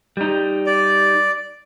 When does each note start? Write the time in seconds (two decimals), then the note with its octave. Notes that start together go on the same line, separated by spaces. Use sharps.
0.17 G3 D#4
0.66 D5